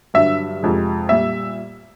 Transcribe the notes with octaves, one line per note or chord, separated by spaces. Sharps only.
G2 D3 F#3 E5
F2 C3 F3 G#3
A#2 G3 E5